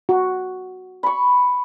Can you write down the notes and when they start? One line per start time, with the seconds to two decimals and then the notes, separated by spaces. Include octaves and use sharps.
0.09 F#4
1.03 B5 C#6